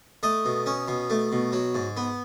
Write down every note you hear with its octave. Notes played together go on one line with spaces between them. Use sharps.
A3 D#5
B2
C#4
B2
A3
B2
F#3
G#2
B3